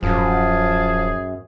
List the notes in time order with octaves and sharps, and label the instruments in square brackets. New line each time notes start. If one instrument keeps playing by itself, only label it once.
[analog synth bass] D1 [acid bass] F#2 [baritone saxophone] F3 [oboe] G#4